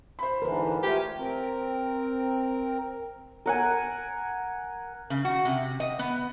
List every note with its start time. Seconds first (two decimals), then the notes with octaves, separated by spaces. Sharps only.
0.19 C5 B5
0.42 G#2 D3 E3 A#4 B4
0.83 A3 F4 G4 G#5
1.18 C4 A#4
3.46 A#4 F#5 G#5
5.10 C#3
5.25 F#4
5.45 C3
5.80 D#5
5.99 B3